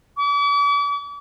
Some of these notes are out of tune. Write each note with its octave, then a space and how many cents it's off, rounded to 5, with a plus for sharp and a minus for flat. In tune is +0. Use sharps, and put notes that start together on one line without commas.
D6 -45